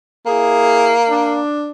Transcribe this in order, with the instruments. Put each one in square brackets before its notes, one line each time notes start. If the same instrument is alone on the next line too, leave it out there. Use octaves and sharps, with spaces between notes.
[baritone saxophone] A#3 [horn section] E4 G#4
[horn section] D4